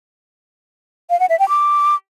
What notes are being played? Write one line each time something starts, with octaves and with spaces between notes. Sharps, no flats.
F5
F#5
E5
G5
D6